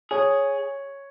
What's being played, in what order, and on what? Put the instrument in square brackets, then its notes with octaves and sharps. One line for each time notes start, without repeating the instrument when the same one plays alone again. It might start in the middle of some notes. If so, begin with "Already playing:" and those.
[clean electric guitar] G#4 [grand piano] C#5